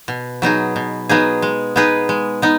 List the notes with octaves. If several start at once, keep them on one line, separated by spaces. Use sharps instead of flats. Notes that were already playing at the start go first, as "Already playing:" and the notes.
B2
F#3 B3 D#4 G#4
B2
F#3 B3 D#4 G#4
G#3
B3 D#4 G#4 B4
G#3
B3 D#4